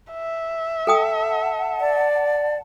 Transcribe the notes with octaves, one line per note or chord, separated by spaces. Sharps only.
E5
A4 F#5 G5 A5 D#6
D5